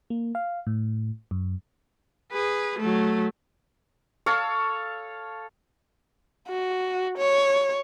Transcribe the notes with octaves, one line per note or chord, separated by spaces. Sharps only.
A#3
F5
A2
F#2
G#4 B4
F#3 A3
A4 C#5 F5
F#4
C#5